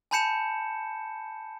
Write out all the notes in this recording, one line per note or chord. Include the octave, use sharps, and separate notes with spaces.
G#5 A5 B5 G6 C#7 E7